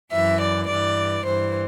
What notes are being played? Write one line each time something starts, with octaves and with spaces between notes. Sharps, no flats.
F#2 E3 E5
D5
G2 E3 D5
G2 E3 C5